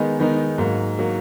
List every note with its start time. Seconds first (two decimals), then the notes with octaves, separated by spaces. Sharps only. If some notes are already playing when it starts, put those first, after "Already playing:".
Already playing: D#3 G#3 B3 D#4
0.20 D#3 G#3 B3 D#4
0.58 G#2 F#3 A#3
0.99 F#3 A#3